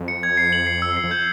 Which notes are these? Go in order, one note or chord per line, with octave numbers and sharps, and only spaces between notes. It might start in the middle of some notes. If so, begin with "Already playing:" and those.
Already playing: F2
C#7
G#6
C7
F#7
C7
E6
C7
F2
G6